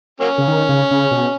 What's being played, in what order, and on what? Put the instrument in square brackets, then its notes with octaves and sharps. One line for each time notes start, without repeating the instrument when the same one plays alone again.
[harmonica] F#3 A#3 C#4
[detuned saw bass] C#3
D#3
C#3
C#3
B2